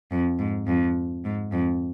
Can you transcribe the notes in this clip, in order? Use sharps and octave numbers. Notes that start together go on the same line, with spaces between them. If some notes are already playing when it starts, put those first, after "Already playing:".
F2
G#2
F2
G#2
F2